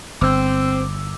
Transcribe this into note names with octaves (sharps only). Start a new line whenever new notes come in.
G1 C4 D6 E6